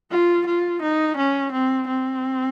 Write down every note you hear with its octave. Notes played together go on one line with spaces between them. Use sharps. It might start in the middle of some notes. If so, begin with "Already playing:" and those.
F4
F4
D#4
C#4
C4
C4